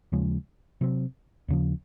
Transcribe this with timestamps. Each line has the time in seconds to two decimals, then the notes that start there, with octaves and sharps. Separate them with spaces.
0.12 D#2 C#3 F3 G#3
0.81 C3 F#3 C4
1.48 D#2 C#3 F3